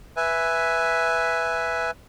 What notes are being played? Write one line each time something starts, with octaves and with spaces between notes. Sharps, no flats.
B4 E5 G#5